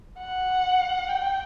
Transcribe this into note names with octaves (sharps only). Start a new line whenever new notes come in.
F#5
G5